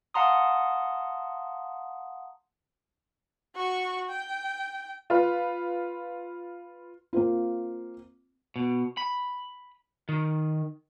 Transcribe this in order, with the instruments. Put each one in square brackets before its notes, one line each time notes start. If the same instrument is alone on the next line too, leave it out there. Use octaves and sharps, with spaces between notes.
[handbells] F5 F#5 A5 A#5 C6 D#6
[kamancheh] F#4 C#6
G5
[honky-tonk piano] F4 B4
[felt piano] A#3 C4 F4
[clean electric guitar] B2
B5
D#3